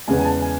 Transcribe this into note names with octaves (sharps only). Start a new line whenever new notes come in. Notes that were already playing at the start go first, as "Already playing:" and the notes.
E2 C#3 G#3 B3 G#5
G#5
A5
G#5